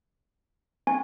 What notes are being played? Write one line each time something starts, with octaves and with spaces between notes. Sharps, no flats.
C4 G#5